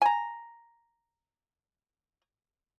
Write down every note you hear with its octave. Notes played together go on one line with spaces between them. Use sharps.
G#5 A#5